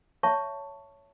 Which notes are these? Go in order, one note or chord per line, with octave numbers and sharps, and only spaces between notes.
C#5 E5 A5 C#6